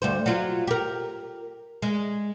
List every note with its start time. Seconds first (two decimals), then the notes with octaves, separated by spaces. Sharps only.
0.02 D2 G2 C5
0.26 F#3 F4
0.67 G4 A#4
1.82 G#3